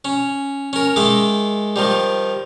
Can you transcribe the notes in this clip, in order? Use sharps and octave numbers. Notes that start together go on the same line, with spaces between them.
C#4
C#4 A#4
D#3 G#3 E5 D6
D#3 F3 G3